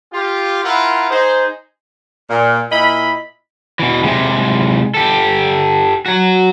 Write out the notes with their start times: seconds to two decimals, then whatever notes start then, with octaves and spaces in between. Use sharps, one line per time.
0.13 F4 G4
0.64 E4 F4 A#4 F#5
1.10 D#4 G#4 C5
2.29 A#2
2.71 A#2 E4 D#5 B5
3.79 B2 E3
4.04 C3 G#3
4.94 G4 A4
6.06 F#3 F#4